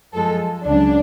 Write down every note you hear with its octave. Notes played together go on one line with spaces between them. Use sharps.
F#2 F3 G#3 A4
C#2 C#3 F#3 D4